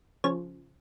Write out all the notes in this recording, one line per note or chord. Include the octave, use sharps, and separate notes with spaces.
C#3 F3 C#5